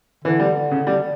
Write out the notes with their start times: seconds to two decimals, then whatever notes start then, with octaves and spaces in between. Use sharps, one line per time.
0.25 D3 E3
0.40 G3
0.71 C#3
0.87 G3